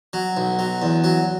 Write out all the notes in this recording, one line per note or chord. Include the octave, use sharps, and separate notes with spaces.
F#3
B1
F#3
E2
F#3